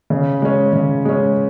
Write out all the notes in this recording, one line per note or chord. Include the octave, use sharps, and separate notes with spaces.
C#3
G#3 C#4
C#3
G#3 C#4